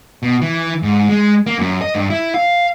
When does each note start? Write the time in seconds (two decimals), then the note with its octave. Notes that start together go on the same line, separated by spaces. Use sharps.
0.23 B2
0.41 E3
0.83 G#2
1.09 G#3
1.47 A#3
1.59 F#2
1.82 D#5
1.95 G2
2.10 E4
2.34 F5